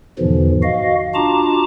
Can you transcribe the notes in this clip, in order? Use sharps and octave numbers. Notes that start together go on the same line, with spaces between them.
E2 G#2 B2 D3 E3 F3
F#4 D#5 F5
D4 F4 F#4 A5 A#5 D6